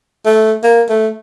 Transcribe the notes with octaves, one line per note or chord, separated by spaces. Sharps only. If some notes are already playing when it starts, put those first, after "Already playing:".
A3
A#3
A3